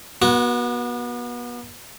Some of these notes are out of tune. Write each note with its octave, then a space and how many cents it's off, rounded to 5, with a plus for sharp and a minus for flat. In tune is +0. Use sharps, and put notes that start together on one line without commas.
B3 -35 F#4 +0